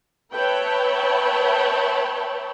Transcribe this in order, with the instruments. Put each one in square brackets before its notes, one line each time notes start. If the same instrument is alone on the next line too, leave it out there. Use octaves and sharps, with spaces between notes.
[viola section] B4 C#5 E5 G5 A5 B5